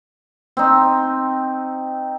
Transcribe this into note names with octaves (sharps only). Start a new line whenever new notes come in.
C4 D#4